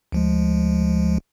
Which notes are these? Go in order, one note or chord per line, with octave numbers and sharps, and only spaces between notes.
D2 F3 G#3